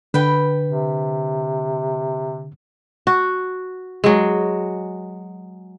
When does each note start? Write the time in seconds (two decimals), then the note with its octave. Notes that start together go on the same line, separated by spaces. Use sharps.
0.14 D3 B4 G5
0.65 C3
3.07 F#4
4.04 F#3 G#3